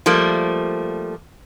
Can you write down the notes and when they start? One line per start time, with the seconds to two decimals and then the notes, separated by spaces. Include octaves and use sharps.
0.06 F3 G3 A3 A#3